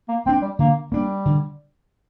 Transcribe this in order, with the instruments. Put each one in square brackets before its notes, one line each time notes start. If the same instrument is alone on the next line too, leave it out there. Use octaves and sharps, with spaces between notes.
[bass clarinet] A#3
[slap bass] A#3 [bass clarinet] C4
[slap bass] D4
[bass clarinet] G3
[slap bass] D3 [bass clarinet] A#3
[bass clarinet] G3 [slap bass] A#3 D4
[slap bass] D3